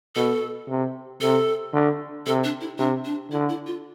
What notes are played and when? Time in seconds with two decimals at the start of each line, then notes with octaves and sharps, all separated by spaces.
0.15 B2 A4
0.68 C3
1.21 C3 A4
1.73 D3
2.26 C3 A4
2.44 D4
2.61 E4
2.78 C3 D4
3.05 D4
3.31 D3 E4
3.49 E4
3.67 F4